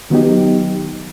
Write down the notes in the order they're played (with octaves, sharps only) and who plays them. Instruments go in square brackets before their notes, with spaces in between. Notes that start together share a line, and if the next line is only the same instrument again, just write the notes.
[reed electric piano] D#3 F#3 B3 D#4 G4